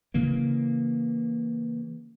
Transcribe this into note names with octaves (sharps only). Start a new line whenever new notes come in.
C#3 E3 A#3